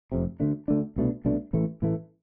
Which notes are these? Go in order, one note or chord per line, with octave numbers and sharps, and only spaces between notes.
F1 F2 C3
D2 D3 A3 D4
D2 D3 A3 D4
C2 B2 A3 D4
C2 B2 A3 D4
A1 A2 E3 A3
A1 A2 E3 A3